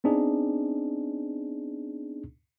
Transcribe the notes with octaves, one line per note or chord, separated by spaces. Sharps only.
B3 C4 D4 D#4 G#4